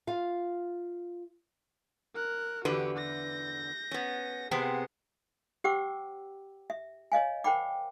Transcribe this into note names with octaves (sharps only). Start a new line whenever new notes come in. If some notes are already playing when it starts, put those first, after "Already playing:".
F4 F5
A#4 F#6
E2 D3 F#4 G4 B4
G6 A#6
B3 C#4
C3 B3 C4 G#4 F#5
G4 C5 F#5 G5 D6 E6
E5
C#5 D#5 F5 G#5
A#4 C5 F#5 G5 B5 D6